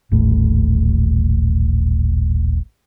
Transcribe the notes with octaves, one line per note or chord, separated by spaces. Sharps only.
D#1 A1 A2